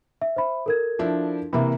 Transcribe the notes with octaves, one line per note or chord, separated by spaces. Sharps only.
E5
C5 E5 B5
A4 A#4 G#6
F3 D4 E4
C3 E3 A#3 E5 B5